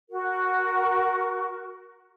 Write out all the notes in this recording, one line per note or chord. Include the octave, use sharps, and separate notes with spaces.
F#4 A#4